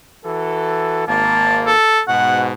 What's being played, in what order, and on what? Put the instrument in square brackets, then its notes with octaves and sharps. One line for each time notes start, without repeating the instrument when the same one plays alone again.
[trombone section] E3 F#4 A4
[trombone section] G#1 A#3 [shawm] A5
[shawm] A4
[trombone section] G#2 B2 [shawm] F#5